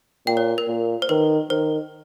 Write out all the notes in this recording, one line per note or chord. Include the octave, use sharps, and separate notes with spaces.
A#2 G5
C#5
A#4
A#2
C5
D#3 B4
D#3 C5